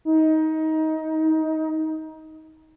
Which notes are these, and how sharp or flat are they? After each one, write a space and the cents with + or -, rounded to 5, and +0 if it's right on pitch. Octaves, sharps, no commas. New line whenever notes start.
D#4 +20